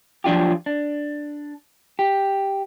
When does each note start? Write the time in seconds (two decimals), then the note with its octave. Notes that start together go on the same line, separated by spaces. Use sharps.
0.24 F3 F#3 D4 F4 G4
0.66 D4
1.99 G4